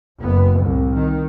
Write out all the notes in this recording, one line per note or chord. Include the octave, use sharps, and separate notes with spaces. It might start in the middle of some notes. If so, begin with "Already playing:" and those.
F#1 B3
C2 A2
D#3